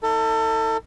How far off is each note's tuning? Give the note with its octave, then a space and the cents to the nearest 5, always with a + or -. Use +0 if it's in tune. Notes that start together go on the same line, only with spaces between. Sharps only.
D#4 +45 A4 +30